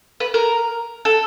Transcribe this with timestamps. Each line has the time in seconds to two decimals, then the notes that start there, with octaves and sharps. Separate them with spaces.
0.20 B4
0.34 A#4
1.05 A4